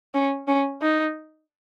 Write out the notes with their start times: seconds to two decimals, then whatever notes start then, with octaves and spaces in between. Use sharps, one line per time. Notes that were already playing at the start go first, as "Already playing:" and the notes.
0.14 C#4
0.48 C#4
0.82 D#4